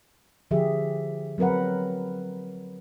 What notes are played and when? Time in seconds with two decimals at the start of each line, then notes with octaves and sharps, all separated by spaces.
0.51 D3 F3 G4 G#4 E5
1.38 F#3 C4 A#4 B4 F#5